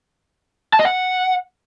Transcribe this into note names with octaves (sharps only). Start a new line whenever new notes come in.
A5
D#5
F#5